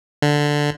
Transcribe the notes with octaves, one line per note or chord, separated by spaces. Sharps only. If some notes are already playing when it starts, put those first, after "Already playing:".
D3